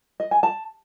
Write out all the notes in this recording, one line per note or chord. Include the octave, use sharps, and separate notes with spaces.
D#5
G#5
A5